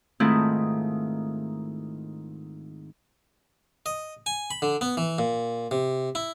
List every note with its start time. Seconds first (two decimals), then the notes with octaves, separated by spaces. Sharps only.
0.20 G#2 D#3 A3 C4 E4 F4
3.86 D#5
4.26 G#5
4.51 B5
4.62 D3
4.81 B3
4.97 E3
5.18 A#2
5.71 C3
6.15 E4